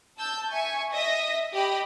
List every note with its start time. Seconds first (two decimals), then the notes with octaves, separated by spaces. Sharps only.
0.18 A5 E6 G6
0.50 E5 G#5 C#6
0.92 D#5 E5 D#6 A#6
1.53 G4 D#5 B5